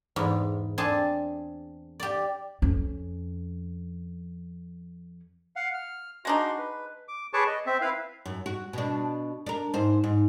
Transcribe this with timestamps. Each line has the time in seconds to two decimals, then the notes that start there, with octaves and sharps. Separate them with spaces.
0.16 E2 G#2
0.78 C4 D4 G#4 G#5 A5
2.00 G4 D5
2.62 F2 C#4
5.56 F5 F#5
5.74 F6
6.25 G#3 D4 D#4 F#4 C6
6.59 B4
7.08 D6
7.33 G#4 B4 C#5 A5 C#6 D6
7.47 D#5
7.66 C4 E5
7.81 E4 B4 F5
8.26 F#2
8.46 F#4
8.73 B2 D4
9.46 D4 A#4
9.74 G#2 C5
10.04 G#2